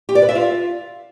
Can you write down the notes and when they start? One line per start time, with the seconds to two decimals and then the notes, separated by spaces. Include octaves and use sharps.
0.09 G4
0.15 D5
0.22 B4
0.29 E5
0.35 F4